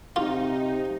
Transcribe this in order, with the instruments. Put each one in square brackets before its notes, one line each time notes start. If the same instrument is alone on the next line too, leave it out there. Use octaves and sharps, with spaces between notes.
[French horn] C3 [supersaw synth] D#4 [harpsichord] F4